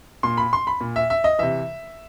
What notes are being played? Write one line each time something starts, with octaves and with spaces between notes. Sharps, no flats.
A#2 C6
B5
C6
B5
A#2
E5
E5
D#5
C3 E3 E5